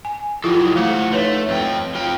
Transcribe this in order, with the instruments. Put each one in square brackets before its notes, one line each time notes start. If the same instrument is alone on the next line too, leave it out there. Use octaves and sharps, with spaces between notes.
[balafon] G#5
[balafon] F3 E4 F4 [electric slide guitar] F#3 G4 A4
[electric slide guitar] F3 F#5 [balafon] A3 F5
[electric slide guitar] A3 [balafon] D#4 B4 C#5
[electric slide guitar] F2 G5
F4 G5